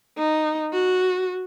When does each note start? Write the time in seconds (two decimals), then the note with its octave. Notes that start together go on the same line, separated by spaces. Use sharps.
0.18 D#4
0.73 F#4